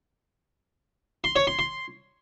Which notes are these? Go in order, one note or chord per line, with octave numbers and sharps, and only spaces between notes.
C6
C#5
C6
C6